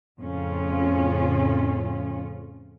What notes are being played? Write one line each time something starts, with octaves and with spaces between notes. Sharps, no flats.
F2 A2 C#3 C#4 F4